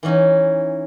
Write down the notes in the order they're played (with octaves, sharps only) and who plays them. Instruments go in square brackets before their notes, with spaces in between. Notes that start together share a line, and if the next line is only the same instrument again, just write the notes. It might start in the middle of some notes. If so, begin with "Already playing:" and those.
[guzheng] E3 B3 C#4 D#4